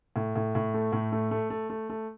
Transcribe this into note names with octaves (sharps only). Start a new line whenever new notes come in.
A2
A2
A2
A3
A2
A3
A3
A3
A3
A3